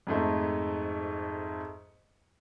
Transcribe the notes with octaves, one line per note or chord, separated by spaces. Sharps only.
F2 G#2 A3